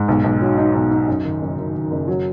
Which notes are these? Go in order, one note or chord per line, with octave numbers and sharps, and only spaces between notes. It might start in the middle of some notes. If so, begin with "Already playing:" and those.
Already playing: G#2
B1
B1
F#3
D#4
B1
D#4
F#2
D#3
F#1
D#3
D#3
F#1
F#3